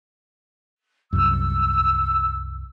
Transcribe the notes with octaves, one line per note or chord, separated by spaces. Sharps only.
C2 F#2 E6